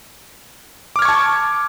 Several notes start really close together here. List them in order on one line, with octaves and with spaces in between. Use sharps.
D6 F6 G#6 C#6 A5